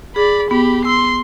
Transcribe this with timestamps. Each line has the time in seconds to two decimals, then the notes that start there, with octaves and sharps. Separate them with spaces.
0.16 G#4 D5 B5
0.51 B3 G4 B5
0.85 C6 E6 C7